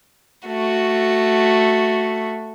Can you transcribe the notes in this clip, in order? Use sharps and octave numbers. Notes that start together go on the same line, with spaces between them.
A3 F#4